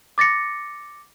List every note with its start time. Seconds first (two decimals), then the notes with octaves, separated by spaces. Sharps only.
0.18 D6 A6 A#6 C#7